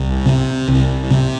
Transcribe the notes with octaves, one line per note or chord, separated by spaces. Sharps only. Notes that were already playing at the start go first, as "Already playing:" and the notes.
Already playing: C2
C3
C2
C3